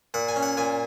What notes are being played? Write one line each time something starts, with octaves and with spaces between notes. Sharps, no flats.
A#2 F#5
G#5
C#4
F#5
A#2 G#5